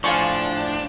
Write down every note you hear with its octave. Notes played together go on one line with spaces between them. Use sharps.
A2 F3 D4 F5 G#5 C#6